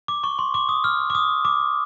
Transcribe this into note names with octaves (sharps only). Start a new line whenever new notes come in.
D6
C#6
C6
D6
D#6
F6
D6
D#6
D6